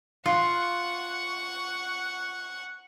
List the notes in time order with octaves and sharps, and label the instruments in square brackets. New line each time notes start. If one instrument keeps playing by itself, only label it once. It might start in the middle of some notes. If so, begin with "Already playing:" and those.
[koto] F4 [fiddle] F#5 C#6